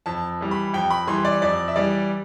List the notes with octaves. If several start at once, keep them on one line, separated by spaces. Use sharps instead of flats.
F2 A5
E3 G3
B5
F2 G5
B5
E3 G3 C6
D5
F2 D5
E5
E3 G3 D5